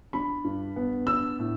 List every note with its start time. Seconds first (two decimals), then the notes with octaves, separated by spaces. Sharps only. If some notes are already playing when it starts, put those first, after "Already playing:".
0.13 D4 B5
0.44 G2
0.76 B3
1.07 D4 E6
1.39 A2